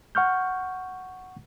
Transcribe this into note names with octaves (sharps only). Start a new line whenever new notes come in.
F#5 C#6 F6 G6